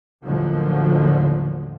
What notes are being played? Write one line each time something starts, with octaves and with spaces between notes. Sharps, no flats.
A1 D#2 D3 D#3 F3 F#3